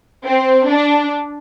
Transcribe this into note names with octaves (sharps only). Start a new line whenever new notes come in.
C4
D4